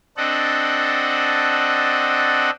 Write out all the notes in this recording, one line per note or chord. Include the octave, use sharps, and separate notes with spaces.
C4 D4 A4 D#5 F#5